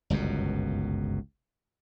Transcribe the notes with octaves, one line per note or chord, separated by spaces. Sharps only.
G1 C#2 F#2 B2